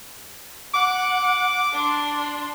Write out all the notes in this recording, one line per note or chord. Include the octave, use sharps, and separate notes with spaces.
F#5 D6
D4 C6